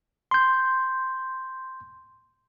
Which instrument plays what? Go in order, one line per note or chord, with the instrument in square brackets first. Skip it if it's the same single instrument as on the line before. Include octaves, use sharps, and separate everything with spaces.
[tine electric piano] C6 G6